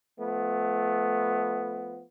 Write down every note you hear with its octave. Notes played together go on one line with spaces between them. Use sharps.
F3 A3 B3